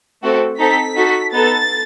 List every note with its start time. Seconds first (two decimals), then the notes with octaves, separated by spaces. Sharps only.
0.23 A3 C4 F#4 A4
0.59 C4 D#4 A4 B6
0.96 D#4 F#4 A4
1.33 B3 D#4 A4 A6